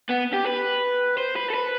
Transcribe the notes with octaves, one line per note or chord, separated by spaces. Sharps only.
B3
G4
B4
C5
B4
A4
B4